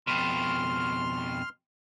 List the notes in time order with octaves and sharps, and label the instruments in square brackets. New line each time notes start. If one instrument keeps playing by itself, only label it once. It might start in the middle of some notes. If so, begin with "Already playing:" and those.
[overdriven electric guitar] F2 B2 [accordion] C6 F6